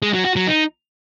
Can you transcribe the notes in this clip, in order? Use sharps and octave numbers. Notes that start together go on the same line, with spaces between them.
G#3
F#3
F#4
F#3
D#4